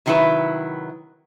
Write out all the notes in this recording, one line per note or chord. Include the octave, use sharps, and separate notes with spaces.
C3 D#3 F#3 G3 E4 B4